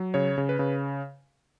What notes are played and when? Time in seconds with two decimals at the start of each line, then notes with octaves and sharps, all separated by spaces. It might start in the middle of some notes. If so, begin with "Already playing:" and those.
Already playing: F#3
0.14 C#3 C#5
0.38 C#3
0.49 B4
0.59 C#3